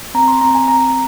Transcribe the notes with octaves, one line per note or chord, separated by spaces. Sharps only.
C4 A#5
C6
C4 A#5
G#5
C4 A#5